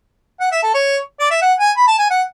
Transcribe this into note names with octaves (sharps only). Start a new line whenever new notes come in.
F#5
E5
A4
C#5
D5
E5
F#5
G#5
B5
A5
G#5
F#5